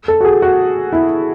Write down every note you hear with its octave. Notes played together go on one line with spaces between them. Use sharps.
A4
F#4
G#4
F#4
E4